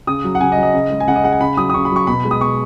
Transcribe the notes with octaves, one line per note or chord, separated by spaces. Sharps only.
C#3 D#6
F#3
F#5
C#3 G#5
D#5
F#3
D#5
C#3
G#3
G#5
C#3 F#5
D#5
G#3 F#5
G#5
C#3 B5
F#3 D#6
D#6
C#3 C#6
B5
F#3 C#6
B2 B5
G#3
D#6
B2 C#6